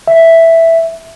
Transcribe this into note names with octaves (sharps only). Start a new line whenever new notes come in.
E5